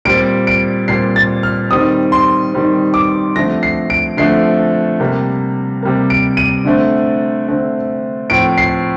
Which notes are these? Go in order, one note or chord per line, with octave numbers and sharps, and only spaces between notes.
A#2 G3 C4 D7
D7
A#2 G3 C4 C7
A6
F6
D#3 G3 C4 D#6
C6
D#3 G3 C4
D6
D3 F3 A3 C4 A#6
C7
D7
D3 F3 A3 C4 C7
C3 G3 A#3
C3 G3 A#3
D7
D#7
D3 A3 C4
D3 A3 C4
A2 F3 C4 D7
C7